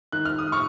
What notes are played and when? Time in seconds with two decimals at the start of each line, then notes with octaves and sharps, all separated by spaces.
0.12 D#3 F#6
0.25 F6
0.39 D#6
0.52 C#6 F6